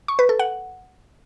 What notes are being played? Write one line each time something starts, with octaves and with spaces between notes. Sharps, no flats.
C#6
B4
A4
F#5